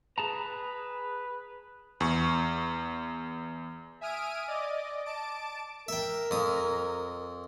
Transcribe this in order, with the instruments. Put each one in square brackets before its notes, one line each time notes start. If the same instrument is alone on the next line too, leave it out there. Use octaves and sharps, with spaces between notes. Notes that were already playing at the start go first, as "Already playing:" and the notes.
[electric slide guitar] G#4 A5 A#5 [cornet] B4
[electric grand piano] E2 C#6
[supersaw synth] E5 G#5 D#6 F6 D7 D#7
D5 D#5 D6
A5 D6 D7
[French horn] A#4 [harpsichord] E5 G5
[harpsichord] F2 D#6